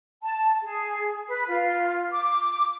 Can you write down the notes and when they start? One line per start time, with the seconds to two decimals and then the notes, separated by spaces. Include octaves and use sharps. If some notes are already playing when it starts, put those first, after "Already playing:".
0.22 A5
0.63 G#4
1.28 B4
1.48 F4
2.12 D6